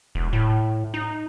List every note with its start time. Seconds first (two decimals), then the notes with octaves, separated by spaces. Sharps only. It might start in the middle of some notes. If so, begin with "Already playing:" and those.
0.15 E1
0.33 A2
0.94 D#4